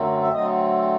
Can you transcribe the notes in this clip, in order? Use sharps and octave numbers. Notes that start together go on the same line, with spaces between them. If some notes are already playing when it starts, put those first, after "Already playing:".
Already playing: F#2 D3 F#3 A3 C4
E5
D3 F#3 A3 C4 D#5